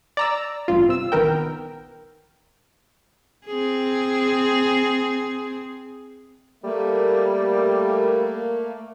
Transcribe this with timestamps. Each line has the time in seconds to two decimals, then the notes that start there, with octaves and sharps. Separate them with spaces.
0.17 D5 A#5 E6
0.68 A1 G2 F4
0.89 C3 E6
1.12 A#1 D#3 B3 A#4 G5
3.46 C4 G#4
6.64 G3 A3 A#3